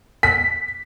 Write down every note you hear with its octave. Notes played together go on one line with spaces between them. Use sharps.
B6